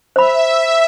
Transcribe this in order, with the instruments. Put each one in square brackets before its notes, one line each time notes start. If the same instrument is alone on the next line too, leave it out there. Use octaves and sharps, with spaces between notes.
[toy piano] C5 B5 [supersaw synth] E5